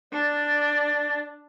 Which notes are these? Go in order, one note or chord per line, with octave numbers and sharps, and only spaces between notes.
D4 D5